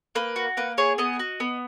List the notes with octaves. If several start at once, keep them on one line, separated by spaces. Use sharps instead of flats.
A#3 B4
F#4
A#3 B4
G#4 C#5
B3 D#5
F#4
B3